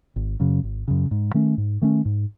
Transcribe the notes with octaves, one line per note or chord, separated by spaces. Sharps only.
G#1
F#2 C#3
G#1
F#2 C#3
G#2
D#3 A3 C#4
G#2
D#3 A3 C#4
G#2